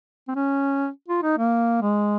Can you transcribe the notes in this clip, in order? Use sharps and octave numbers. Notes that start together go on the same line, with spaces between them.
C4
C#4
F4
D#4
A#3
G#3